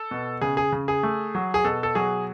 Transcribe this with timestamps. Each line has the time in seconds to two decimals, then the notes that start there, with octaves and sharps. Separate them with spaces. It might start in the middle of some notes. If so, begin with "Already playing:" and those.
Already playing: A4
0.11 B2
0.41 C#3 G#4
0.57 G#4
0.72 C#3
0.88 G#4
1.03 A3
1.35 F#3
1.54 G#4
1.64 B2 A4
1.83 A4
1.95 F#3 G#4